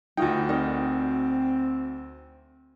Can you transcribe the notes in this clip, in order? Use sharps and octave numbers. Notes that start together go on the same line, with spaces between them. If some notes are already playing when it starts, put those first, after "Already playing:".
D2 D#4 F4 F#4 G5 G#5
C4 D#4 A#4 D5